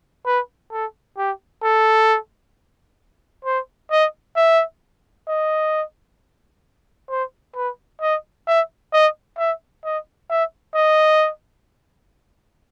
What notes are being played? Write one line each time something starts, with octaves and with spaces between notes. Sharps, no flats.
B4
A4
G4
A4
C5
D#5
E5
D#5
C5
B4
D#5
E5
D#5
E5
D#5
E5
D#5